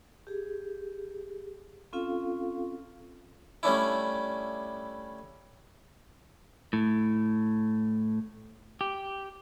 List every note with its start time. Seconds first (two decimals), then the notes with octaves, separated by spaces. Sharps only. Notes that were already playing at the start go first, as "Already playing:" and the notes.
0.27 G4 G#4
1.93 C4 C#4 F4 A4 F5
3.63 G3 A3 C#4 D4 E4
6.73 A2
8.81 G4